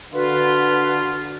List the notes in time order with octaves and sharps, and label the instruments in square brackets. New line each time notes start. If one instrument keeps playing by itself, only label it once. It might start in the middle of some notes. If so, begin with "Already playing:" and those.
[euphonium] D3 [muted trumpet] F4 [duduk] F#4 [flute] B4